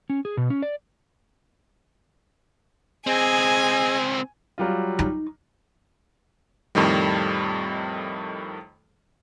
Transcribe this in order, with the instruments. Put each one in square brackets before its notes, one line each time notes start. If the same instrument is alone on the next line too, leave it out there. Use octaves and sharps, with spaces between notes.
[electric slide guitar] C#4
G#4
B2
C#4
D5
[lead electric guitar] C#2 C4 [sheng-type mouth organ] G#4 D#5 [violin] G#5
[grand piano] F#3 G3 F4
[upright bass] D#4
[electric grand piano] F2 A2 D#3 G3